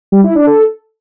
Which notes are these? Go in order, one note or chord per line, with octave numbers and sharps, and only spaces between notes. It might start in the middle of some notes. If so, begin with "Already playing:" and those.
G3
E4
D4
A4